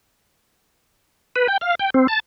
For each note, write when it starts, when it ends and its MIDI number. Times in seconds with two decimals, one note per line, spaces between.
1.36 1.47 71
1.48 1.58 79
1.61 1.75 77
1.79 1.90 79
1.94 2.07 60
2.08 2.20 81